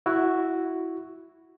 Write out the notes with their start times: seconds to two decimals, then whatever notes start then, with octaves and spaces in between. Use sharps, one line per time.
0.06 E4 F#4